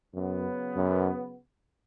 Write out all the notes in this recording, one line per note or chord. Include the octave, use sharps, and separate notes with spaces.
F#2 C#3 F#3 B3
F#2